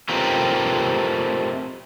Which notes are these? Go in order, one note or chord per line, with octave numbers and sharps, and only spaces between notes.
A3 C4 F4 G4 A#4 B4